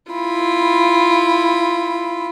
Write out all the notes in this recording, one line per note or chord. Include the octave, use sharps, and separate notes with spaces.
E4 F4 B5